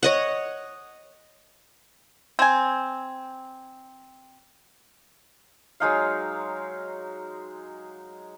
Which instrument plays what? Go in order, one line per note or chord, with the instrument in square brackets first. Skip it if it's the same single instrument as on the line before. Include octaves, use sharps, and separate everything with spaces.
[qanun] C#5 D#5 F#5
[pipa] C4 G#5
[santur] F#3 G#3 D#4 F5